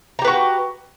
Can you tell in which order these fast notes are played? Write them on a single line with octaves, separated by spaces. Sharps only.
A#5 G4 B4 F#4